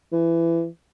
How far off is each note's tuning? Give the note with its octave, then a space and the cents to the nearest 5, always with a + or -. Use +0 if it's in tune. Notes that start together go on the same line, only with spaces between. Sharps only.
E3 +20